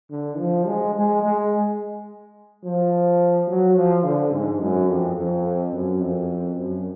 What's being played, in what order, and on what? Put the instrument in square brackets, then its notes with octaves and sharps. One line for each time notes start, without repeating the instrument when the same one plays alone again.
[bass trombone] D3
F3
G#3
G#3
G#3
F3
F#3
F3
D3
G#2
F#2
F2
F2
F#2
F2
F#2